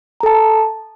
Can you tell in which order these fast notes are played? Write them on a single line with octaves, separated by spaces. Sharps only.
A#5 A4 A5